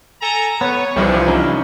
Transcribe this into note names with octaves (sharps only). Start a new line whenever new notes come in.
A4 G#5 A#5
B3 B4 C#5
C2 C3 E3 F3 G3 D4 E4
C#4 D#4